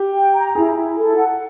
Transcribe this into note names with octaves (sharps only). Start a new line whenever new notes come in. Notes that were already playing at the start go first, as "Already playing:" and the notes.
Already playing: G4
G5
A#5
E4 G#4
E4
A4
F#5